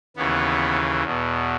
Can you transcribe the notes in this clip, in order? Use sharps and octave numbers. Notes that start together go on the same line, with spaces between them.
D#2 C#3 E3 B3
E2 B2